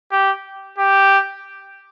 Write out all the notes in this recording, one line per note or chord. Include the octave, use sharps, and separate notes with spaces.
G4
G4